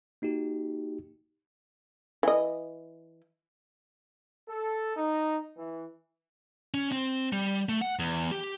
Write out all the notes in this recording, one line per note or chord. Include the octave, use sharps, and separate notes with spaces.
A#3 D#4 F#4 G4
E3 D#5
A4
D#4
E3
C#4
C4
G3
A3
F#5
E2
G4